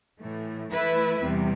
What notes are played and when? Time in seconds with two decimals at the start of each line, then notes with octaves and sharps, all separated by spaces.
0.19 A2 E3 A3
0.70 E3 A3 E4 B4 E5
1.21 E2 C3 G3